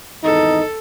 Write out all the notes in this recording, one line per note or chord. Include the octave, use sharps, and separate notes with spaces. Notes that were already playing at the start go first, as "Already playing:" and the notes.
G#1 E2 D#4 A4